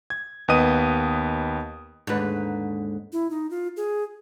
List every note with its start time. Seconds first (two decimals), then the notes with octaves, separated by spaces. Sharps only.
0.10 G#6
0.48 D#2 B3 B4 D#5 D#6 D#7
2.07 D#2 G#2 D3 B4
3.13 E4
3.31 D#4
3.51 F4
3.77 G#4